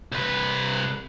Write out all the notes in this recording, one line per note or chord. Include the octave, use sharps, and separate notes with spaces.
C2 B4